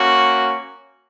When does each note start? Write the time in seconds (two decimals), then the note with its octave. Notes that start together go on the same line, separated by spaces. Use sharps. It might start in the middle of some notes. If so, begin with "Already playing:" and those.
Already playing: A#3 C#4 F#4